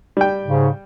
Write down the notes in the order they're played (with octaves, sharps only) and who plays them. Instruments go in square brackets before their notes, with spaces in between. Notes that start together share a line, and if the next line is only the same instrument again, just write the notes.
[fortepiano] G3 G5
[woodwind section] G#2 C#3